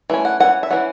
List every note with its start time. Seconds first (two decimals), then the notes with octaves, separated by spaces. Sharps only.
0.10 E3 A3 C#4
0.25 F#5
0.40 E3 C#4 F#5
0.63 E5
0.71 E3 C#4 F#5